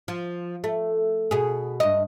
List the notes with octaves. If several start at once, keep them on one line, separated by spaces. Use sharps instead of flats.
F3
A3
B2 G#4
G2 D#5